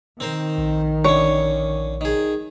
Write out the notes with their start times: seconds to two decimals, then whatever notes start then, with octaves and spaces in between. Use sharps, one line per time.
0.20 D#3 C4 A#4 C5
0.58 A#1
1.04 D3 C#4 C#5
2.01 D#3 G#4